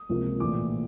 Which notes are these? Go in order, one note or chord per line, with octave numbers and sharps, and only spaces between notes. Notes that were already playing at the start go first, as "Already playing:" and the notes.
Already playing: D#6
C#2 C3 F3 A#3
A#1 A2 E3 D6